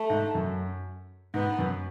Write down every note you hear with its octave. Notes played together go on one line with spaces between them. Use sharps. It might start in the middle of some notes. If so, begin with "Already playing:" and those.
Already playing: A3
G#2
F#2
G#2 B3
F#2